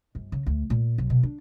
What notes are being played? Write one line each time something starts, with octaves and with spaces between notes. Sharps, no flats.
G1
C#3
D2
A#2
B1
B2
D4